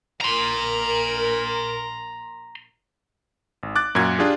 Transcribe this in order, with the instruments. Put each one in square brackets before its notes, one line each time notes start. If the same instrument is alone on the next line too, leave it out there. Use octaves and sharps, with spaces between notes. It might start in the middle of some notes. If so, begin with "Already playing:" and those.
[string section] A#1 A#4 [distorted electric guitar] A#5 C6
[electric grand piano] G#1
D6 F#6 A6
F#2 A#2 F#4 G#6
D4 F4 G4 G#4